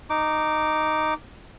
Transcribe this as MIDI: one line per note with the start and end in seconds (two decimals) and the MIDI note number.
0.10 1.14 63
0.10 1.14 86